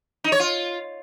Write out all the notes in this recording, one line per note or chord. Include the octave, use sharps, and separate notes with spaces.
D#4
C#5
F4